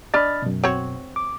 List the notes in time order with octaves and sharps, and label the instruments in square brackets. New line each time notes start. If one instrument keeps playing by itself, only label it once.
[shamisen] D4 D#5 [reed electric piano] B5 F6 A6
[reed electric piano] F#2 B2
[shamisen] C4 F#4 C#5
[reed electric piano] D6